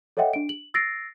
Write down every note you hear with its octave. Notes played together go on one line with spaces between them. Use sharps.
A4 C#5 D#5 E5 F#5 G5
D4 D7
F#7
E6 A6 A#6 C7 D7